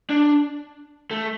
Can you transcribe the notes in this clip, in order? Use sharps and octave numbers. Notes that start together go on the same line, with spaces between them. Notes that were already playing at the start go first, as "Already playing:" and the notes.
D4
A3